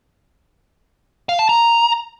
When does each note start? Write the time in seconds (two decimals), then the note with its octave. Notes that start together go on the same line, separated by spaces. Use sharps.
1.29 F5
1.39 A5
1.49 A#5